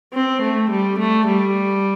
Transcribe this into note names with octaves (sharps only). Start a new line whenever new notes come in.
C4
A3
G3
A3
G3